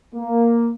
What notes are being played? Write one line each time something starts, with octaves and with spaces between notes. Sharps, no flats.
A#3